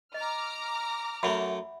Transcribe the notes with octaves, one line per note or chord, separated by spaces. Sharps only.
D#5 A#5 D6 F6
F#2 A3 E5 F#5 B5